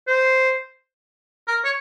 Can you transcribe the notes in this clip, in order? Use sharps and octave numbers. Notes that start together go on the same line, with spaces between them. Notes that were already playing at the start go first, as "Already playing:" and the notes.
C5
A#4
C#5